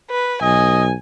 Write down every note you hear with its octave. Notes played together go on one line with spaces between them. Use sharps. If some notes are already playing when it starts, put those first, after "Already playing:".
B4
B1 D#5 G#5